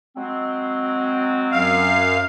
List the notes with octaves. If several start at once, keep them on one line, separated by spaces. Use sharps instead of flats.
F#3 G#3 C4
F#2 F5